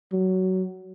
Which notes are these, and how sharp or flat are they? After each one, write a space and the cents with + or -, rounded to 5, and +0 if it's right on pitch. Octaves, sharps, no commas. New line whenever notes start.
F#3 +15